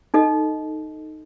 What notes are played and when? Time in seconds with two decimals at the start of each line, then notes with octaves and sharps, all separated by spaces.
0.14 D#4 A4 D#5